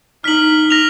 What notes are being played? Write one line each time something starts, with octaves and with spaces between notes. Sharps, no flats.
D#4 F6 B6 F#7
F6 A#6 F7